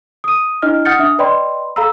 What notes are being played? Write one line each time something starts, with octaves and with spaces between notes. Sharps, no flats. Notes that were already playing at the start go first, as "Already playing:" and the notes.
D#6 D#7
D4 E4 D#5 F6
F#5 D#6 F6 G6 A6 C#7
D4 E5 D#6
B4 D5 D#5 G5 B5 C6
A4 F5 A#5 B5 E6